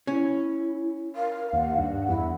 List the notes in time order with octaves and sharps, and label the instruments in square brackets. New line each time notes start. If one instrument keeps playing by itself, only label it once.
[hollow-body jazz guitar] C#4 [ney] E4
[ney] A#4 [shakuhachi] F5
[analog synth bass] D#2 [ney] F#5
[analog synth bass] G2
[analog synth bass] E2 [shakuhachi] E4